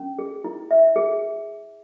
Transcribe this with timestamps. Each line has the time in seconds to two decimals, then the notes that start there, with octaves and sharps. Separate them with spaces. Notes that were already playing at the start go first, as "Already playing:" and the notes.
Already playing: C#4
0.19 G#4
0.44 E4
0.71 E5
0.96 G#4